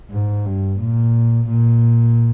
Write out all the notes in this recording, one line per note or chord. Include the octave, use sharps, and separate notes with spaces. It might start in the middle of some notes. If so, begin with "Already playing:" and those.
G#2
G2
A#2
A#2